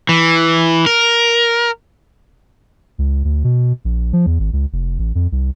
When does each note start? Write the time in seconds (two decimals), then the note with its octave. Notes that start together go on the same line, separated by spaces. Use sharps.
0.09 E3
0.86 A#4
2.98 C#2
3.24 D2
3.44 B2
3.85 A#1
4.13 F3
4.26 E2
4.39 G#1
4.53 C#2
4.73 F1
4.99 A1
5.15 F2
5.32 C2